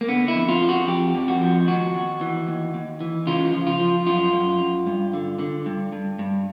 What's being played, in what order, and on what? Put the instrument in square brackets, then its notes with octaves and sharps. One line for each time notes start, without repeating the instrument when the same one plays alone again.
[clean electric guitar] A#3
D3 B3
E4
F2
F4
F3
F#4
F2 G4
F2
F#4
F3
D#2 F#4
D#2
E3
D#2
D#2
E3
C#3 F4
F3
F4
F3
F#2 F4
F#2
F#2
G2
D3
D3
G2
G2
G2